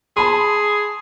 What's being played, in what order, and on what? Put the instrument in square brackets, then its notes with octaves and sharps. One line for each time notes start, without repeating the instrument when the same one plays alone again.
[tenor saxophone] G#4 [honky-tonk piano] A5 B5 C6